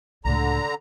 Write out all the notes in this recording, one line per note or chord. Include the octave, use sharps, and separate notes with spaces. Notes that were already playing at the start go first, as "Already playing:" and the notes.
C#2 A2 D3 A#5